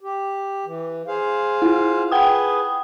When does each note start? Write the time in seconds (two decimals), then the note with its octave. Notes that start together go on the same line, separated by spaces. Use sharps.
0.01 G4
0.65 E3
1.07 G#4 C5 F5
1.62 E4 F4
2.11 G#4 B4 F#5 G5 D#6